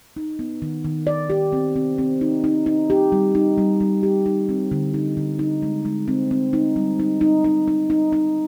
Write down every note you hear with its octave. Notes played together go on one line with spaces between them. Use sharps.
D#4
B3
D#3
D#3
D5
G4
C4
C4
C4
D#4
D#4
D#4
G4
G3
D#4
G3
G3
G4
D#4
C4
D3
D#4
D3
D#4
G#3
G#3
C4
C4
D#4
G3
D#4
D#4
D#4
D#4
D#4
D#4